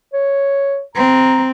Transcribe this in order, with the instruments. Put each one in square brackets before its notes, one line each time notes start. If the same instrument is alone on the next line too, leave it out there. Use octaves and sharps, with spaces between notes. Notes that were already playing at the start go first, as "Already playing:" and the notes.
[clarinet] C#5
[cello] C4 [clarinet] A#5